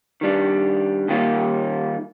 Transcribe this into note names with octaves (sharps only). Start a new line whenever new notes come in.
D#3 G3 D4
D#2 D#3 G3 A#3 F4